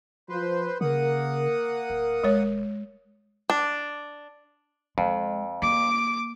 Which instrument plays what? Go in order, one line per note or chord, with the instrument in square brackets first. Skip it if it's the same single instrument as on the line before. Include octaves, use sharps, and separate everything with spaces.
[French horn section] F3 [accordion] B4 C5
[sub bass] C#3 [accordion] A#3 F#5 D#6 [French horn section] A#4
[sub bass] D1
[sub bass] D#1 [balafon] G#3 C#5
[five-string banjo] D4
[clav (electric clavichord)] F2 [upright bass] G#3
[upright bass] A#3 [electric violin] D6 D7